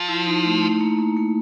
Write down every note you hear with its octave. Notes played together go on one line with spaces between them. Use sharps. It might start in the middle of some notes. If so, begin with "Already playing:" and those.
Already playing: F3
E4
D#4
A3
A3
A#3
A#3
A#3